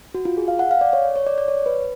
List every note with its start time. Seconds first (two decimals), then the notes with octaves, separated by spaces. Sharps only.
0.15 F#4
0.25 F4
0.37 G#4
0.48 F5
0.59 F#5
0.71 F5
0.81 D5
0.93 C#5
1.16 C#5
1.27 D5
1.38 D5
1.48 C#5
1.66 B4